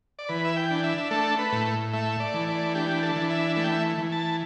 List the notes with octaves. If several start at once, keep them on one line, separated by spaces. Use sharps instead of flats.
D5
E3 B4
E5
G5
D4
E5
A3 A4
B4
A2
A3 E5
D5
E3
D5
D4 G4
A4
E3
E5
A3 E5
G5
E5
E3
A5